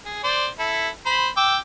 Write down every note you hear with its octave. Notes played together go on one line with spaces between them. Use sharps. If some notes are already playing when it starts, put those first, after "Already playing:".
G#4
C5 D5
E4 A4
C5 B5
G5 D6 E6